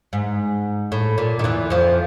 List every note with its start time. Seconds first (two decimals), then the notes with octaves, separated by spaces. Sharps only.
0.13 G#2
0.92 A2
1.18 A#2
1.39 D#3
1.44 E2 E3
1.70 F2 F3